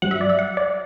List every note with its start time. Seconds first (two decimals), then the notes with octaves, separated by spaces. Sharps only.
0.02 G2 F#3 F#5
0.11 E5
0.21 D5
0.30 E5
0.39 F#5
0.57 D5